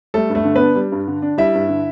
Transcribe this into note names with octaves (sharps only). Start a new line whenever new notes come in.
G3 A3 A4
G2
A3 A4
D3
B3 D4 B4
G3
G2
D3
D4
G3 E4 E5
G2
D3